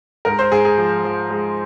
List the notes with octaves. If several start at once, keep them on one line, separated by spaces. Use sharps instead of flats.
G#2 A#4
C5
G#2 G#4
G#4
F3
F3
G#3